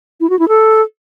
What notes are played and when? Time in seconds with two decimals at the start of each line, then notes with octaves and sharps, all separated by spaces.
0.20 E4
0.30 F#4
0.39 E4
0.48 A4